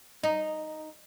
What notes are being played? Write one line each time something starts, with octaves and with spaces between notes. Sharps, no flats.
D#4